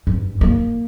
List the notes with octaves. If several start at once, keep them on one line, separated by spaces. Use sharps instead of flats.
G2
A#3